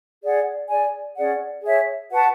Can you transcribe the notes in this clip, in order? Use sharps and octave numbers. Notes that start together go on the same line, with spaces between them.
G#4 D5 F#5
G#4 D5 G#5
C#4 G#4 D5 F#5
G#4 C#5 E5
F#4 B4 F#5 A5